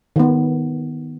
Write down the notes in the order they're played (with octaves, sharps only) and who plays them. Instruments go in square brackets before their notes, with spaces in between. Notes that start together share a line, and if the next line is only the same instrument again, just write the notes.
[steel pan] D#3 B3